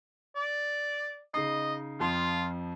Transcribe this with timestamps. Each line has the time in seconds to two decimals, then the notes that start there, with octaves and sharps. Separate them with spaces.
0.36 D5
1.34 C#3 D#4 D#5 C7
2.00 F2 F3 F4 C6